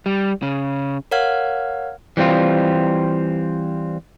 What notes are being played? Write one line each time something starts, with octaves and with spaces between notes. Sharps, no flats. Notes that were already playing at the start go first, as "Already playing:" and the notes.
G3
C#3
A#4 C#5 F5 F#5 F6 G#6
E3 G3 C4 F4